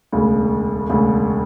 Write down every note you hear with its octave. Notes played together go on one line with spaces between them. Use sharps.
E1 D2 C#3
E1 D2 C#3